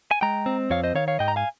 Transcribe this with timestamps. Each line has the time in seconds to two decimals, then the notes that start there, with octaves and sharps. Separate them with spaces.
0.11 G#5
0.21 G#3 G5 A#5
0.46 C4
0.70 F2 C#5 F5
0.83 C5 D#5
0.95 D#3 C#5 F5
1.08 C#5 F5
1.19 G#2 D#5 G5
1.28 A#5
1.36 F5 G#5